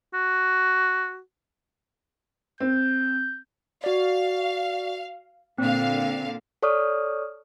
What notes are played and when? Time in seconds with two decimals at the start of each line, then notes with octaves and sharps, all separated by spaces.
0.14 F#4
2.60 C4 G6
3.84 F#4 D5 F5
5.58 A#2 D3 C4 F5
6.62 A4 C#5 D5 C#6 D#6 F6